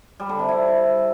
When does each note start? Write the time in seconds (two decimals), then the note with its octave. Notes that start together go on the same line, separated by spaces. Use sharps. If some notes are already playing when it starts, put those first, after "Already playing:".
0.20 G3
0.29 D3
0.39 C3
0.49 E4